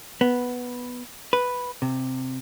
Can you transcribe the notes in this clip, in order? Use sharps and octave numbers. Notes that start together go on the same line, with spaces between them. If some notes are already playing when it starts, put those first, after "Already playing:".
B3
B4
C3